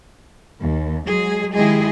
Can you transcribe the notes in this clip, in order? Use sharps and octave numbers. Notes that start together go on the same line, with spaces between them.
D#2
F#3 G#3 G#4
D#3 G#3 E4 G4 G#4 D#5